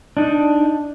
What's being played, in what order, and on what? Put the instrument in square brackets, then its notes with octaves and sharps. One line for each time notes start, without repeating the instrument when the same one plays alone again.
[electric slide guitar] D4 D#4